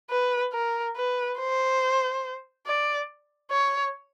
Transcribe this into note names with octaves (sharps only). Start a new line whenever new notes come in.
B4
A#4
B4
C5
D5
C#5